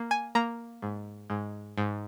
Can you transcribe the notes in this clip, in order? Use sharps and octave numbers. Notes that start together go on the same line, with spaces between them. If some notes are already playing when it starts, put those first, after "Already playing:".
Already playing: A#3
G#5
A#3 A#5
G#2
G#2
G#2